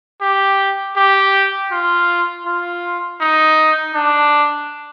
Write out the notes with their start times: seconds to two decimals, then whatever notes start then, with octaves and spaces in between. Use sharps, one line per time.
0.21 G4
0.96 G4
1.71 F4
2.46 F4
3.20 D#4
3.94 D4